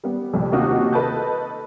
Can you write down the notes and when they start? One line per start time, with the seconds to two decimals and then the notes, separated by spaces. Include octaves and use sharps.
0.04 G3 B3
0.33 C2 F2 A2 C3
0.52 D#2 C3 D#4 F4 F#4 D#6
0.93 A4 B4 D#5 A5 G6